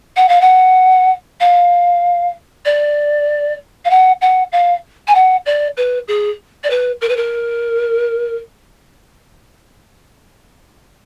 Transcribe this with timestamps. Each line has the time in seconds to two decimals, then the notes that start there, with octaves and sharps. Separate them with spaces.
0.17 F#5
0.29 F5
0.41 F#5
1.41 F5
2.65 D5
3.85 F5
3.90 F#5
4.22 F#5
4.52 F5
5.08 G#5
5.15 F#5
5.46 D5
5.77 B4
6.08 G#4
6.64 D5
6.70 B4
7.01 A#4
7.09 B4
7.17 A#4